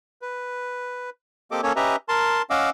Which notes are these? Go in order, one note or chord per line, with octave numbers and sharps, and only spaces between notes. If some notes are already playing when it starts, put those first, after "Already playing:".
B4
A#3 C4 G4 A4 D#5 D6
A#3 C#4 A4 C#5
C#4 G4 B4 D#5 E5 A#5
A#4 A5 C6
C#4 D#5 F5 F#5 D6 E6